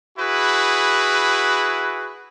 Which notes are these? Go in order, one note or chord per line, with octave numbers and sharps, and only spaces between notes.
E4 F#4 G#4 B4